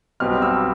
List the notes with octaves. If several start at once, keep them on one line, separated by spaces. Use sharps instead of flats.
B1 B2 G3 C4 F6
E6